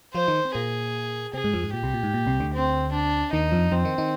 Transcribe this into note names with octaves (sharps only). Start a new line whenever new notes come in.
F3 F4 C5
D#3 D#4
C4
A#2 A#3 G#4
C3 C4 G#4
G#2 G#3
F2 F3
G#2
A#2 G4
C2 C3
A#2
G#2
A#2
C2 C3
D2 D3
C4
D4
D#2 D#3 D#4
F2 F3
F2 F3 C4
D#3 D#4
D#3 D#4